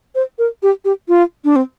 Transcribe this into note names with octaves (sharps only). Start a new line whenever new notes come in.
C5
A#4
G4
G4
F4
D4
C4